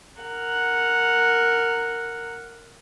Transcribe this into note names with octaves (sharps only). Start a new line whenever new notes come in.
A#4 F#5